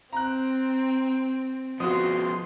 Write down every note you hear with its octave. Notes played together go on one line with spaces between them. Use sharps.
C4 A#5 F#6
F3 B3 F#4 C6 D#6